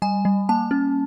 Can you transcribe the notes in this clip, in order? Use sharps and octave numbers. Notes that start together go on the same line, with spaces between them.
G3 G#5
G3
A#3 A5
C#4